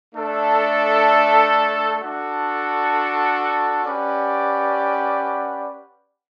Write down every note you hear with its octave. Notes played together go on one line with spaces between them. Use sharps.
A3 D4 A4 E5
D4 F#4 A4
C#4 G4 B4 D5 F#5